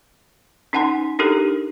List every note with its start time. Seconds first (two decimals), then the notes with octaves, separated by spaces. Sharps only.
0.73 C#4 D#4 F#5 G#5 C6
1.19 D4 D#4 G4 A4 A#4